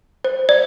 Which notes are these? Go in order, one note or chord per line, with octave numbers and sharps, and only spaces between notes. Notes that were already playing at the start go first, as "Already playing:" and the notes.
C5
D5